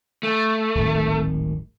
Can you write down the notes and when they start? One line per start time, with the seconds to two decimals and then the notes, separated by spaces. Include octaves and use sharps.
0.23 A3
0.75 D1 G#1 D#3